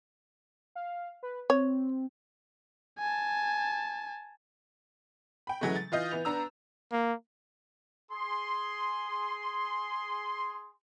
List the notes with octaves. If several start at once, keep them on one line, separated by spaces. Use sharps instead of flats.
F5
B4
C4 C#5
G#5 A5
G5 B5
C#3 E3 F#3 G#3 A3
A6
E3 F4 D#5 G6
E3 B3 F7
B3 D4 A#5 E6
A#3
G#4 C6